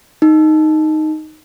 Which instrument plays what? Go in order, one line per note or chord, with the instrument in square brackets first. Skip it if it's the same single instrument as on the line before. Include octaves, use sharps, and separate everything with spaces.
[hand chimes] D#4